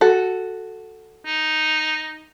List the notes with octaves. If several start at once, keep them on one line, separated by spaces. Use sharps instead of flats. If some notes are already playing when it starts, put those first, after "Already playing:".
F#4 A4
D#4